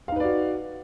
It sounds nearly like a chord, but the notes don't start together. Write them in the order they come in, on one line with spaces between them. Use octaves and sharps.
F5 D#4 B4 D5 F#4